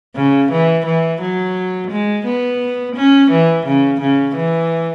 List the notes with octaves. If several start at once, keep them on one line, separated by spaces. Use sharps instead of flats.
C#3
E3
E3
F#3
G#3
B3
C#4
E3
C#3
C#3
E3